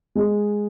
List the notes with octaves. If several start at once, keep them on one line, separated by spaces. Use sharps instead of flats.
G#3